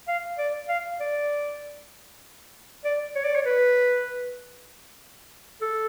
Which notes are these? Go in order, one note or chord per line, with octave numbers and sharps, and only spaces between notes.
F5
D5
F5
D5
D5
C#5
D5
C#5
B4
A4